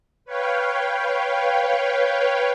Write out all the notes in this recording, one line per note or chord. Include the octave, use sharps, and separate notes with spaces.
B4 C#5 F5 G5